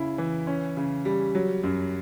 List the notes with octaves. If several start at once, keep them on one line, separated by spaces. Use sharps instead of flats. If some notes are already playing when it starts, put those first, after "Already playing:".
Already playing: C#3 E4
E3
C#4
C#3
G3
F#3
F#2